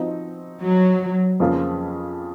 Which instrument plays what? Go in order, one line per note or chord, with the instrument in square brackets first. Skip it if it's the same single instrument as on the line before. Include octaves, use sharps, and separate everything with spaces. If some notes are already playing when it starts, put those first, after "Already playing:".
Already playing: [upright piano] F3 C4 D#4 F#4
[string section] F#3
[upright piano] F2 C#3 F3 A#3 F4